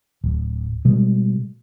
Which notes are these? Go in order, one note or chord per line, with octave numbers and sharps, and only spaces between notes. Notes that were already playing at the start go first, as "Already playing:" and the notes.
D1
B2 G3 G#3